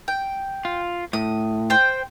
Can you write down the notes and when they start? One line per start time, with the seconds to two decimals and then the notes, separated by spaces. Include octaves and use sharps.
0.08 G5
0.65 F4
1.13 A2 D#6
1.70 C5 G5